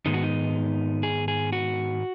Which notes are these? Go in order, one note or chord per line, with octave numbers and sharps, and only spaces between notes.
G#2 D#3 G#3 B3 D#4
F#4
D#4
G#4
G#4
F#4